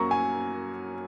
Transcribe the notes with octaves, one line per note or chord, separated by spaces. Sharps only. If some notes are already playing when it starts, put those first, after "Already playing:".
Already playing: F#2 F#3 A#3 A#5 C#6
G#5